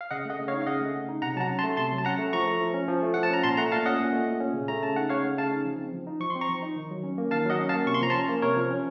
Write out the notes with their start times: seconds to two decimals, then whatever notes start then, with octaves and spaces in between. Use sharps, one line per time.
0.01 F5
0.11 C#3 D#5 F#5
0.25 A3 D#5 F#5
0.39 C#3
0.48 C#5 F5
0.53 D#4
0.62 F5
0.66 C#3 D#5 F#5
0.81 A3
0.94 C#3
1.09 D#4
1.22 C3 F#5 A#5
1.36 F#3 A5
1.40 F#5 A#5
1.50 C#4
1.59 A5 C6
1.63 A3
1.77 C3 A5 C6
1.92 F#3
1.98 A5
2.05 C#4 F#5 A#5
2.18 A3
2.33 F3 A#5 C#6
2.47 A3
2.61 F3
2.74 C#4
2.88 F3
3.02 A3
3.14 F3 F#5
3.23 A5
3.30 C#4 A#5
3.44 A#2 A5 C6
3.57 A3 F#5 A#5
3.72 A#2 F5 A5
3.85 C#4 D#5 F#5
4.00 A#2
4.13 A3
4.26 A#2
4.40 C#4
4.54 C#3
4.68 A3 A#5
4.83 C#3 A5
4.96 D#4 F#5
5.09 C#3 C#5 F5
5.23 A3
5.38 C#3 F5 A5
5.52 D#4
5.65 F3
5.80 C4
5.93 F3
6.07 D#4
6.20 F3 C#6
6.30 C6
6.35 C4
6.41 A#5 C#6
6.49 F3
6.62 D#4
6.76 D#3
6.91 F#3
7.03 C#4
7.18 A#3
7.31 D#3 F5 A5
7.46 F#3 D#5 F#5
7.60 C#4
7.69 F5 A5
7.73 A#3
7.87 C3 C#6
7.94 C6
8.01 F3 A#5
8.10 A5 C6
8.15 C#4
8.29 A#3
8.42 C3 A#4 C#5
8.57 F3
8.71 C#4